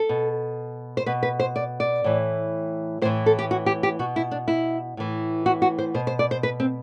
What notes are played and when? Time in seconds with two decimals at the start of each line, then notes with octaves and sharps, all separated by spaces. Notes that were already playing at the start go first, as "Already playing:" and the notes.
Already playing: A4
0.09 B2
0.97 C5
1.06 B2 B4
1.23 B4
1.40 C5
1.56 D5
1.80 D5
2.04 A2 E3
3.02 A2 C5
3.05 E3
3.26 A4
3.39 G4
3.51 F#4
3.66 G4
3.83 G4
3.99 B2 F#4
4.16 E4
4.31 D4
4.48 E4
4.97 A2 E3
5.46 F#4
5.62 F#4
5.79 C5
5.94 B2 C5
6.07 C5
6.19 D5
6.31 C5
6.43 B4
6.60 C4